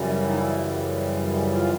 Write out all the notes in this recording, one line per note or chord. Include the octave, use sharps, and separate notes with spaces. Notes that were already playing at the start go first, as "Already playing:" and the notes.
Already playing: F#2 C#3 E3 G3
E4
D#4
E4
F4